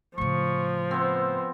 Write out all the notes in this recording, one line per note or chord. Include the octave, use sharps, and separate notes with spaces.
A2 C#3 F3 C#6
B3 C4 C5